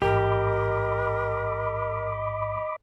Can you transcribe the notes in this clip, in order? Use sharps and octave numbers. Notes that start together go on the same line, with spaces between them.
A1 G#2 G4 A#4 D#5 B5 D6